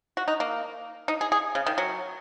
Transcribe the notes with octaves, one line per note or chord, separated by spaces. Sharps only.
F#4
D#4
A#3
D#4
G#4
G#4
C#3
D#3
F#3